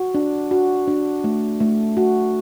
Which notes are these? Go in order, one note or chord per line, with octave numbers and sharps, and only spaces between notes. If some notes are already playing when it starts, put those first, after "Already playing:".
Already playing: F#4
D4
F#4
D4
A3
A3
F#4